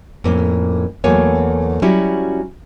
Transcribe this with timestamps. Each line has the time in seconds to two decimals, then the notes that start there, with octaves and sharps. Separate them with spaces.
0.24 F2 A2 A#3 C#4
1.04 E2 F#3 A3 A#3 C#5 G#5
1.82 F#3 G3 C#4 E4 F#4